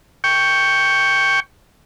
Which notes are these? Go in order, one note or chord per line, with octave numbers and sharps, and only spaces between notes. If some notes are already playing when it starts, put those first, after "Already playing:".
G5 C#6